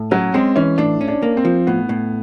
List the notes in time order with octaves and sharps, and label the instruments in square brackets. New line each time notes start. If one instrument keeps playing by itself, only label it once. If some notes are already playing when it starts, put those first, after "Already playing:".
Already playing: [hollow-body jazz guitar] A2
[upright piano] F#3 [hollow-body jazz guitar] C#4
[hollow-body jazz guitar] G#3 [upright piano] C4
[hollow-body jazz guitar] E3 [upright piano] C#4
[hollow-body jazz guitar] A2 [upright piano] D4
[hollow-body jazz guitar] C#4
[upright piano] D4
[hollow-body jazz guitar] A#3
[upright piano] C4
[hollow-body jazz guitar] F3
[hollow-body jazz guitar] A2 [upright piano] B3
[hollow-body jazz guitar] A2